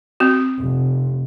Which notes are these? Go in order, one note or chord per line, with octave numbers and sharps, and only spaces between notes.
C4 F#4
F1